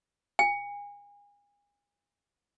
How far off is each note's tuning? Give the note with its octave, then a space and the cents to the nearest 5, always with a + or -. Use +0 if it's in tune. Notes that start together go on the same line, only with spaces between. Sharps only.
G#5 -30